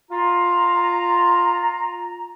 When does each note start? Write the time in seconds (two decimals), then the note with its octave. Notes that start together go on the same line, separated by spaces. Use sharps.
0.10 F4 A#5